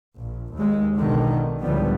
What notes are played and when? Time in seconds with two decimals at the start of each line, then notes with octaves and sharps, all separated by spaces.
0.20 A#1
0.55 D#2 G#3
0.97 B1 B2 D3 D#3
1.60 C#2 A2 D3 F3 G3 B3